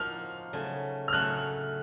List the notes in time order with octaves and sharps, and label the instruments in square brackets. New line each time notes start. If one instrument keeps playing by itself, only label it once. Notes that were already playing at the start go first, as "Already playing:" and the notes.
Already playing: [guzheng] F3 A#3 D#4 F#4 [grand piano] F6
[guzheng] C#3 F#3 A3
[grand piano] F6
[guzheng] C#3 F#3 A3 [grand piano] F#6